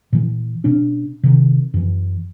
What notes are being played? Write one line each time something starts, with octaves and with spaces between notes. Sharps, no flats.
A#2 E3
B2 C#4 D4
C3 D#3
F#2 E3